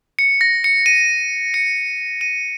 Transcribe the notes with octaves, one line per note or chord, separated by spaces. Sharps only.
C#7
A#6
C#7
D#7
C#7
D#7